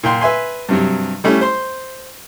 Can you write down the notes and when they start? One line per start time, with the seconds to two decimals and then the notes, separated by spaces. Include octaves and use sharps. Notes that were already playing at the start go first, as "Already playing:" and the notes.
0.03 A#2 G5 C6
0.21 B4 E5 G#5 C6
0.69 G2 C3 F#3
1.24 G3 A3 C#4 E4
1.41 C5 C6